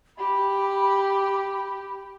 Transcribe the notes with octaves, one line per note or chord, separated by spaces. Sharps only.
G4 B5